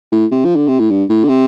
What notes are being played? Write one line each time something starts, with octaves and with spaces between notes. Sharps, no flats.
A2
C3
F3
D3
C3
A2
G2
A2
D3
C3